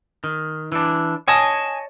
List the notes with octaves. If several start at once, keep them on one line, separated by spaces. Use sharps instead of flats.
D#3
E3 D4
C#5 D#5 G#5 A5 D#6